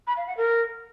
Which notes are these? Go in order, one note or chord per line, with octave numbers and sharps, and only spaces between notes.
B5
F5
F#5
A#4